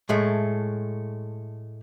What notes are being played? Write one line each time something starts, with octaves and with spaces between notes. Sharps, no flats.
A2 G#3 A3